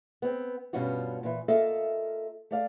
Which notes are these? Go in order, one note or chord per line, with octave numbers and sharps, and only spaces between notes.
B3 C4
G2 B2 G3 C#4 F4 F#4
A#2 E3
A#3 F4 A4 D#5 E5
A3 D5 F5